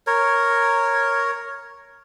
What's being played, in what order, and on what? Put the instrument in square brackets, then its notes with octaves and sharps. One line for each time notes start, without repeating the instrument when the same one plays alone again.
[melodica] A#4 C#5